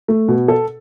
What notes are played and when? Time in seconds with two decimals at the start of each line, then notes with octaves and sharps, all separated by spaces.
0.08 A3
0.28 B2
0.48 A4